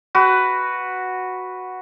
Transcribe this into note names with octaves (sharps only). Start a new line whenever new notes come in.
F#4 B4